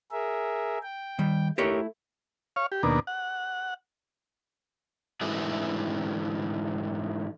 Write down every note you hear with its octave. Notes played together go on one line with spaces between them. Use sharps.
G#4 A#4 E5
G5
D#3 G3
A3 E4 G4 A#4 C#5
C#5 F5
G4
D#2 B2 A#3 D4
F#5
G#2 D3 E3 A3 F#4 G#4